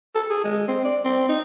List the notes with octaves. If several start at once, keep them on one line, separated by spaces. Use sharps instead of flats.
A4
G#4
G#3
C4
D5
C4
D#4